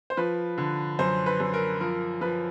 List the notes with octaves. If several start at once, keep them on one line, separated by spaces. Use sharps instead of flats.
C5
F3 B4
D3
F#2 C5
B4
F#2
A#4
F3 A#4
F3 B4